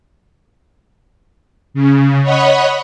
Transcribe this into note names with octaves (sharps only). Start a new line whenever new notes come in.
C#3
C#5 D#5 F#5 B5